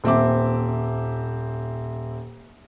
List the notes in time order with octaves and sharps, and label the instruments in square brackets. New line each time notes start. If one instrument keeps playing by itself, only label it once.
[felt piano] D#1 C4 E5 D6